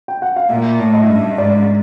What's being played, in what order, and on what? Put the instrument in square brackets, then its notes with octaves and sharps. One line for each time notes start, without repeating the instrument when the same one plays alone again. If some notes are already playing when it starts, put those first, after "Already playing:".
[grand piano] G5
F#5
F5
[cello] A#2 [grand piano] E5
[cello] A2
[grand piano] D#5
E5
[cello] G2 [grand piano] D#5
[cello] G#2 [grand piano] D5